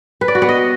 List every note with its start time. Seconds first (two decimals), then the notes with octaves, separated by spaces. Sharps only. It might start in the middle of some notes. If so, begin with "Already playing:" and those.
0.21 B4
0.28 D5
0.35 F#4
0.42 B3
0.49 D#5